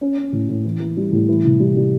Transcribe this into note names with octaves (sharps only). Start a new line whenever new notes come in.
C#4
C#4
A2
A2
E3
E3
G3
A2
E3
C2
G3
G3